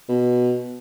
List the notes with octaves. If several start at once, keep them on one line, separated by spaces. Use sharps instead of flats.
B2